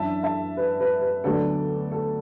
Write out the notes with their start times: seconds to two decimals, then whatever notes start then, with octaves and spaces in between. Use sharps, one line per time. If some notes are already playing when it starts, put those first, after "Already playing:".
Already playing: F#2 E3 D4 E5 A5
0.23 E5 A5
0.57 B4
0.80 B4
1.01 B4
1.24 D2 D3 F#3 B3 A4 D5
1.92 A4